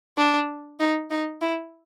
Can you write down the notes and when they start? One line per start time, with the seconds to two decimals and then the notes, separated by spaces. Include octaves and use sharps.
0.17 D4
0.80 D#4
1.10 D#4
1.41 E4